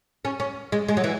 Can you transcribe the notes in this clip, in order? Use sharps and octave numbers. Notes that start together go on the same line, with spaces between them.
C#4
C#4
G#3
G#3
F#3
E3